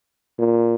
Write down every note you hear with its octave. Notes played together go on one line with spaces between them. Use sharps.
A#2